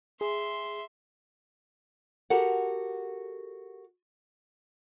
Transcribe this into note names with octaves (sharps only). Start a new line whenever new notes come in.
G#4 E5 C6
F#4 G4 A4 A#4 F#5